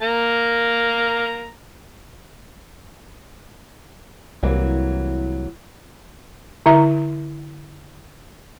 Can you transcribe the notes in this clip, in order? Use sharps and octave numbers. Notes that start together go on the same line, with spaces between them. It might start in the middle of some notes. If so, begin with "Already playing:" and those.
A#3 A#5
C2 E3 F#3 A#3
D3 E4 E5 A#5